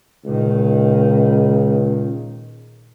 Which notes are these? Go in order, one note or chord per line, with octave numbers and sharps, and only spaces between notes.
C#2 A#2 D#3